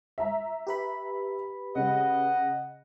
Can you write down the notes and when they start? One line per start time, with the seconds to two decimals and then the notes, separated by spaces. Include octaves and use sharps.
0.18 E5 A#5
0.67 G4 B4 B5
1.75 C#3 D#5 F#5